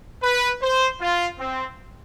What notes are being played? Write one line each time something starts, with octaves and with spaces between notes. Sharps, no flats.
B4
C5
F4
C4